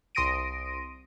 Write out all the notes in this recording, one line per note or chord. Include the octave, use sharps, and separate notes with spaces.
C2 C6 D#6 A#6 D7 D#7